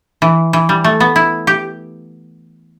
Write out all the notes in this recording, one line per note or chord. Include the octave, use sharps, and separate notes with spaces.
E3
E3
G3
A3
B3
E4
G4